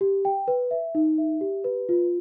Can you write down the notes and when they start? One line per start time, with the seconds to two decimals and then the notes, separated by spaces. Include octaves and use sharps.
0.01 G4
0.25 G5
0.48 B4
0.71 E5
0.95 D#4
1.18 E5
1.41 G4
1.64 B4
1.89 F4